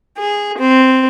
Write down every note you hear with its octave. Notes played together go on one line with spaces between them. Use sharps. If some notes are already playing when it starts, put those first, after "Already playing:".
G#4
C4